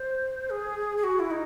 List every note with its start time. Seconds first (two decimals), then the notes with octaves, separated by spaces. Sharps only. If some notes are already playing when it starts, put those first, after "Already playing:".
Already playing: C5
0.50 G#4
0.97 G#4
1.03 F#4
1.19 E4
1.30 D#4